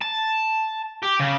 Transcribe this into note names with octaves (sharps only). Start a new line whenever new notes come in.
A5
G4
C#3